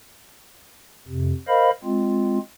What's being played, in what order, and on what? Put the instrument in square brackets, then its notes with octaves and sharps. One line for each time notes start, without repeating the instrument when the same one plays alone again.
[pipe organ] F2 C3
A#4 C5 D#5 F5 B5
G#3 C4 F4